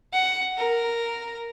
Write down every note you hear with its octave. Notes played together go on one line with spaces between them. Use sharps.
F#5
A#4